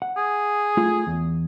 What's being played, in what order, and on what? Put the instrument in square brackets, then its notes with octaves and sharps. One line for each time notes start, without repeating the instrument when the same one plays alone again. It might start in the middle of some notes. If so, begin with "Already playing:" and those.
[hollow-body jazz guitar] F#5
[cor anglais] G#4
[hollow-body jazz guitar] A3 F4
E2